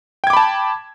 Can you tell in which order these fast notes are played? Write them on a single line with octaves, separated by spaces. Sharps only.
G5 G#6 D6 B5 A5